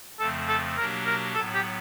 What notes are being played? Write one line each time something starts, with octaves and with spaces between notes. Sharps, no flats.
F2 C#3 F3 A3 C4 A4
A4
B2 F#3 A#3 D4 G4 A#4
A#4
A2 F#3 B3 A4
G4